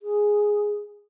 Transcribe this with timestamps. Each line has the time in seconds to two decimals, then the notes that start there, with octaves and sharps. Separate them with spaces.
0.02 G#4